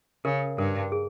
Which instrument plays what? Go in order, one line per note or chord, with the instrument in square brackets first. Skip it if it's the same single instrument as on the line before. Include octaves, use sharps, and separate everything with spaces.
[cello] C#3 [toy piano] A#4
[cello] G2 [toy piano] A#4
[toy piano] G#4